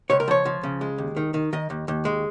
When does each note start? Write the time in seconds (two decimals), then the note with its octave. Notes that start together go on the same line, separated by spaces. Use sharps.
0.10 C#2 C#5
0.20 A#4
0.28 F3 C#5
0.45 F3
0.63 C#3
0.81 G#3
0.98 D#2
1.16 D#3
1.34 D#3
1.53 D#3 D#5
1.70 D#2
1.88 D#2
2.05 G#3